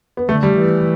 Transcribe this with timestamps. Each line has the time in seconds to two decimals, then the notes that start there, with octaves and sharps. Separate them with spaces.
0.17 B3
0.29 D3 A3
0.43 G3
0.57 E3